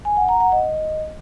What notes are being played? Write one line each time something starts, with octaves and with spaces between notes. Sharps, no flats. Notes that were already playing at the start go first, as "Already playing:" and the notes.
G#5
F#5
A#5
F#5
D#5